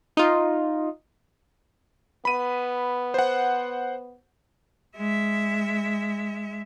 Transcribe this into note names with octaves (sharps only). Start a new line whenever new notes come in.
D#4 F4
B3 B5 D#7
C5 F#5
G#3 E5